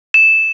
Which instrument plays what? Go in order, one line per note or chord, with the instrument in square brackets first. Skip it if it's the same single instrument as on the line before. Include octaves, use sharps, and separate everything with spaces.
[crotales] E7